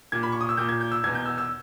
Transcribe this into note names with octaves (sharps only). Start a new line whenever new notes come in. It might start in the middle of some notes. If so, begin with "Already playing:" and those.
A#2 G#6
B5
C#6
D#6
E6
A#2 G6
G#6
G6
E6
E2 B2 G#6
G6
E6
E6